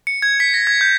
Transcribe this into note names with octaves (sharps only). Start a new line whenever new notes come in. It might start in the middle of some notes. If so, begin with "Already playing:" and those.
C#7
G#6
B6
A#6
G#6
G6